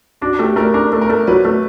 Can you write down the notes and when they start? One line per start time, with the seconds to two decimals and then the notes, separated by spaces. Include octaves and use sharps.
0.21 D4 F#4
0.39 A3 G4
0.56 A3 A#4
0.74 D4 A#4
0.93 A3
1.01 A#4
1.10 A3
1.27 F#3 B4
1.45 A3